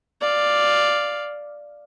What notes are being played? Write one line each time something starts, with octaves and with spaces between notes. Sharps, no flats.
D5 F5